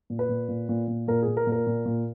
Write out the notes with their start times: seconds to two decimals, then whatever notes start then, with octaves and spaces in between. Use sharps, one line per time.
0.10 A#2
0.19 B4
0.29 A#2
0.49 A#2
0.69 A#2
0.88 A#2
1.08 A#2 A#4
1.22 G#4
1.28 A#2
1.37 A#4
1.47 A#2
1.52 A#4
1.67 A#2
1.86 A#2